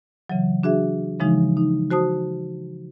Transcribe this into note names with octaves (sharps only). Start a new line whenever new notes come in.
C#3 E3 F#3
D4 F#4 G#4 E5
C#3 E3 F3 G#3 D#4
D#4
F#4 C5 A5 D#6